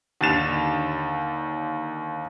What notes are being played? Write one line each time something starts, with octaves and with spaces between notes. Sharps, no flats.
D#2 D3 A6 E7 F7